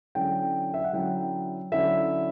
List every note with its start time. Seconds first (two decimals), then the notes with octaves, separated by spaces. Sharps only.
0.15 D3 F#3 C#4 E4 G5
0.74 E5
0.84 F#5
0.93 D3 F#3 C#4 E4 G5
1.72 D3 F#3 C#4 E4 E5